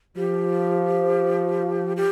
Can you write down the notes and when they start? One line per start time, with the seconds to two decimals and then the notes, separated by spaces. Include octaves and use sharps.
0.17 F3 G4
1.97 G4